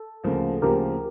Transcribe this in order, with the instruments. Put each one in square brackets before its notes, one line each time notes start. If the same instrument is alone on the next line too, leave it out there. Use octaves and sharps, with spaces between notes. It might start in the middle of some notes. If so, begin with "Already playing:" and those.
Already playing: [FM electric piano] A4
[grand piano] D2 C#3 F3 A#3
[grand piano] D2 C#3 F3 A#3 [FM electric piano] G4 A#4